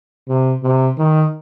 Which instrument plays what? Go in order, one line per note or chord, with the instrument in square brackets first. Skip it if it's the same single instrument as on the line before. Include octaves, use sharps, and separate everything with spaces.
[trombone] C3
C3
D#3